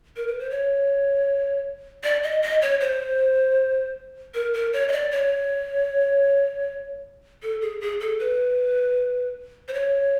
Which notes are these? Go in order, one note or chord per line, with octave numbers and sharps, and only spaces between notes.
A#4
B4
C5
C#5
D5
D#5
D#5
C#5
C5
A#4
A#4
C#5
D#5
D5
C#5
A4
G#4
G#4
A4
B4
C5
C#5